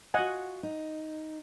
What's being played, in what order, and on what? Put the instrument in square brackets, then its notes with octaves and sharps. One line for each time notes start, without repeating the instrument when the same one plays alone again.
[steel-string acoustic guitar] F4 F#4 [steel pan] D#5 F#5 G#5
[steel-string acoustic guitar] D#4